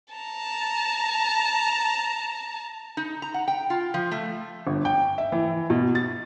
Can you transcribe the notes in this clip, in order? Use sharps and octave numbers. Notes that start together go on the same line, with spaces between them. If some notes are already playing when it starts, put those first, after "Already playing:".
A5 A#5
D#4
A#5
F#5
G5
F4
F3
A3
G1
G5
E5
E3
B2
A6